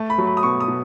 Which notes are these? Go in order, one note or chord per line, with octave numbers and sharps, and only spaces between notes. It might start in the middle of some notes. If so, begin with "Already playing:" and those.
Already playing: A3 A5
B5
F#3
B5
D#6
B2 C#6
D#6
B2